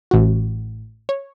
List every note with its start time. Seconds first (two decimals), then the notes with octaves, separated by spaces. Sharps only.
0.11 A1 F#4
1.09 C#5